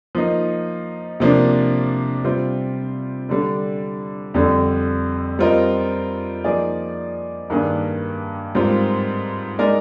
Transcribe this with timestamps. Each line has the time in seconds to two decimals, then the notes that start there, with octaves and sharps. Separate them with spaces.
0.15 F3 A#3 D#4
1.20 C3 F3 A#3 D4
2.24 C3 G3 C4 F4 C5
3.29 D3 G3 D4
4.34 F2 D3 G3
5.39 G3 C4 F4 A#4 D#5
6.44 F3 A#3 D#4 G#4 D5
7.50 G2 D#3 A#3 D4 G#4
8.55 G#2 G3 C4 F4 A#4
9.59 G#3 D#4 A#4 D5